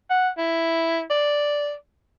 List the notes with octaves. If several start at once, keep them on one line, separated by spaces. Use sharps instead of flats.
F#5
E4
D5